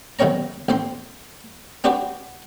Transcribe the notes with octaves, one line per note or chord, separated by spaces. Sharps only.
B1 C3 D#3 C4 C#5 A#5
A1 C4 C5 C6
C4 D4 F#4 G4 B4